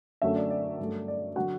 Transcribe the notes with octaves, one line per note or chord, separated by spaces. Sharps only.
F#2 D3 F#3 A3 E5
D5
D5
G2 F#3 A3
D5
D3 F#3 F#4 F#5